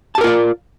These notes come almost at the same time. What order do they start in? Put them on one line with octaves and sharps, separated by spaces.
A5 G4 A#4 F4 D5